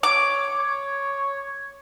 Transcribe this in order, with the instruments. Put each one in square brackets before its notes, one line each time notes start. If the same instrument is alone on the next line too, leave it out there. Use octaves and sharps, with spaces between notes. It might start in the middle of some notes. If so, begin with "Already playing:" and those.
[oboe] C#5 [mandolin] D6
[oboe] C#5